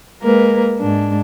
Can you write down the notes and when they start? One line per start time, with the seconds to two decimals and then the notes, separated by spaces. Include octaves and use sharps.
0.22 G#3 A#3 A#4 B4
0.80 G#2 D4